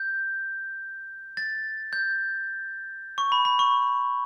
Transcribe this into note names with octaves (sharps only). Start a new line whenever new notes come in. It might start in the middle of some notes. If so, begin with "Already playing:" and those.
Already playing: G6
A6
G6
C#6
B5
B5
C#6